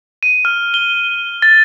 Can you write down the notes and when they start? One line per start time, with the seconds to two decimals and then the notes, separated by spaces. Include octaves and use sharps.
0.23 D#7
0.45 F6
0.74 G7
1.42 A6